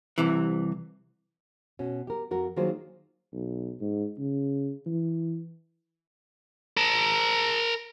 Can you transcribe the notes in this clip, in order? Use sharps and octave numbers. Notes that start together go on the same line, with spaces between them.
C2 C3 E3
B2 C#4
G4 A#4
F2 F#4 A#4
D#3 F#3 A#3 F4 G#4 C5
B1
G#2
C#3
E3
A#4 A5